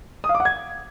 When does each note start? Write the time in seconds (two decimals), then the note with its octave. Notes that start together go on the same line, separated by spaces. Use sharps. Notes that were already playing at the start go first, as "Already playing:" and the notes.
0.24 D#6
0.29 F5
0.35 D6
0.40 F#5
0.45 G#6